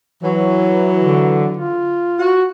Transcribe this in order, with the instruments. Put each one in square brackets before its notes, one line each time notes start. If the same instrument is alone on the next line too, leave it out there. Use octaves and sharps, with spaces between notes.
[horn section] E3 F#3
[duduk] D3
F4
[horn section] F#4